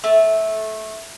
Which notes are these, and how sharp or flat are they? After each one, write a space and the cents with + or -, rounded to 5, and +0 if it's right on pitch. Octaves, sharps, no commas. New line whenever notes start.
A3 -15